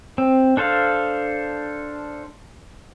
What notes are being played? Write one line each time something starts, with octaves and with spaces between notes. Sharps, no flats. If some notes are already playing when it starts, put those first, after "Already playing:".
C4
D4 A4 C5 F5